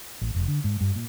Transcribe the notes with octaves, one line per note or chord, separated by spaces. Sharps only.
A1
F1
D3
G#2
G2
A#2